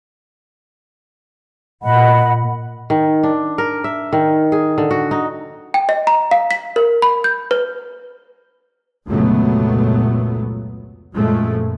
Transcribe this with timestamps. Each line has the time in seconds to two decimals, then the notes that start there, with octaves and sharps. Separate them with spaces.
1.83 A#2 D#5 F#5 B5
2.90 D#3
3.23 D4
3.58 A#4
3.84 E5
4.13 D#3
4.52 G#4
4.78 D3
4.91 F#4
5.11 D#4
5.74 G5
5.89 D#5
6.07 A#5
6.31 F5
6.51 B6
6.76 A#4
7.02 B5
7.24 G6
7.51 B4
9.08 F1 C#2 A#2 F#3 A3 B3
11.15 F#2 A#2 F3 G#3 A3